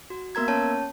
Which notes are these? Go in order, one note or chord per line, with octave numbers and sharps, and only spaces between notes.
F#4
A#3 B3 A#4 A#5 G#6
C#4 C#5 A5